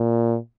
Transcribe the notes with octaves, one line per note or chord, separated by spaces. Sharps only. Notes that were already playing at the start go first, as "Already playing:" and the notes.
Already playing: A#2